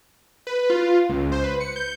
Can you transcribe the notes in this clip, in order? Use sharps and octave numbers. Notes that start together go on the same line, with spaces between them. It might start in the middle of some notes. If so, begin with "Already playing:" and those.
B4
F4
C#2
C5
B4
C#7
G6